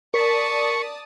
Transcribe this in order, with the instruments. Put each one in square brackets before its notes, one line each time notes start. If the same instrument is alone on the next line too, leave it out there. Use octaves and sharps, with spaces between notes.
[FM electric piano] A#4 B6 [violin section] D5 A5 D#6 [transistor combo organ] C#6